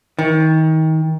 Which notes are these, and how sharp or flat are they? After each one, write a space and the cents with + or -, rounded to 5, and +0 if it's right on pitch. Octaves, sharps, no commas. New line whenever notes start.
D#3 +30